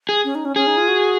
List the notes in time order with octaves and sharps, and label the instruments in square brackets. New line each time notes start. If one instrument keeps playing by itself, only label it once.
[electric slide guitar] G#4
[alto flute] C#4
D#4
C#4
[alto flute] C#4 [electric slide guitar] G#4
[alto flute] D#4
F4
F#4